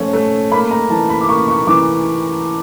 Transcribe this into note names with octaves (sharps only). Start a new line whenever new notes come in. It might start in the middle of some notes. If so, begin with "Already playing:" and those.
Already playing: F3 A3 C#4
A3
A#3 B5
A#5
E3 A5
B5
D6
A#3 C#6
C#6
E3 D6